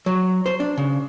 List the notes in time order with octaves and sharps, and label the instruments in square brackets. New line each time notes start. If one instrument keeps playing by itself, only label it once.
[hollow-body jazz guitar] F#3
C5
D4
C#3